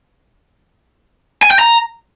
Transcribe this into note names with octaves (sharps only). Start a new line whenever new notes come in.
G#5
G5
A#5